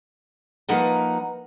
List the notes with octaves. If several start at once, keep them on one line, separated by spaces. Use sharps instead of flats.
F3 A#3 D#4 B4 F#5 A#5